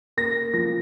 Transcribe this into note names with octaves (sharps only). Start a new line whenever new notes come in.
A#3 A#6
F3 A#6